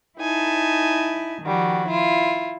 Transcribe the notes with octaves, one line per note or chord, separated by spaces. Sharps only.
D#4 E4 G#5 A5
D#3 F3 G3 F#4
E4 F4